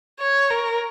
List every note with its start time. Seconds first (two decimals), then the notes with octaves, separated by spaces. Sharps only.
0.20 C#5
0.50 A#4